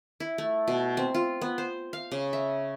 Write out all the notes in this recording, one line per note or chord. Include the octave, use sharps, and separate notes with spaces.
E4
A3
B2
C4
F4
B3
C5
F5
C#3
E5